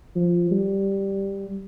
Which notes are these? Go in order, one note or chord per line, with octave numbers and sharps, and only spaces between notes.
F3
G3